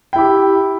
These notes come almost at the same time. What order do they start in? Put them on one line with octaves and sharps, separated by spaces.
G5 E4 G4